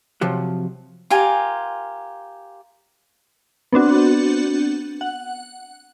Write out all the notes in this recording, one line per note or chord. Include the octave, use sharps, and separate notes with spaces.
C3 F3 F#3
F4 G4 A#4 G#5
B3 C4 D4 F#4
F#5